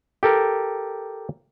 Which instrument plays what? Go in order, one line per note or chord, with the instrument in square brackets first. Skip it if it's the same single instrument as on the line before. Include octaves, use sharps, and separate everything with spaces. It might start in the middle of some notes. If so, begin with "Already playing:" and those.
[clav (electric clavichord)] G4 A4 A#4